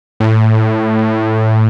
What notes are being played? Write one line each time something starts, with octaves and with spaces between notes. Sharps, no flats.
A2